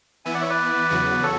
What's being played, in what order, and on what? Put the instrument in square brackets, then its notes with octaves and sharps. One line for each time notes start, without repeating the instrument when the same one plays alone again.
[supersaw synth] E3 B3 E4 [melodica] E5 G#5
[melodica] D5 F#5
C#5 E5
B4 D5
[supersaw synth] E2 C#3 F#3 B3 F#4
[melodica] A4 C#5